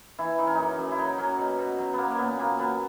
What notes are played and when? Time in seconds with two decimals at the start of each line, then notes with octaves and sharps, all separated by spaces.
0.19 E3 E4
0.38 E3 D#4
0.47 C#4
0.55 F#2 D#4
0.78 F#2
0.92 E4
0.98 F#3 D#4
1.18 F#3 C#4
1.38 B2
1.59 B2
1.79 F#3
1.93 B3
1.98 F#3 A#3
2.11 A#3
2.18 A#2 B3
2.39 A#2 A#3
2.59 F#3 B3